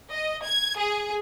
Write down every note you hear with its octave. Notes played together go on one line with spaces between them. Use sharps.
D#5
G#6
G#4